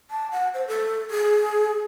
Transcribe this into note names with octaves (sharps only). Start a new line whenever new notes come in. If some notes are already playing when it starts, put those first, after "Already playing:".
A5
F#5
C5
A4
G#4